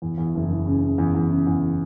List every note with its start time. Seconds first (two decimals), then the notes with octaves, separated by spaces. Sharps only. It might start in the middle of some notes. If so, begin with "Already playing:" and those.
0.02 E2
0.18 E2
0.35 F#1
0.50 F#1
0.67 C#3
0.82 C#3
0.98 E2
1.15 E2
1.31 C#3
1.47 E2